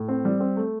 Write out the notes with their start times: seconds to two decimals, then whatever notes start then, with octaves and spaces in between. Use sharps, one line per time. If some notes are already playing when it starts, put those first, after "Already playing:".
Already playing: A2
0.08 C4
0.25 G3
0.40 C4
0.57 A3